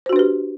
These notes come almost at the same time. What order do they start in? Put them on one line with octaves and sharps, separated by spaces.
C5 F#4 D4 B4 G4